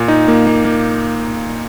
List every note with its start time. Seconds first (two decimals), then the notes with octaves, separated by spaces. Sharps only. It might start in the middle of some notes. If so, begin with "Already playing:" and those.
Already playing: A#2
0.08 D#4
0.28 A#3
0.47 A#3
0.65 A#3